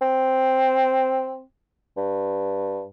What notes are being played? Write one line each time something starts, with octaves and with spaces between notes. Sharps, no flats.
C4
G2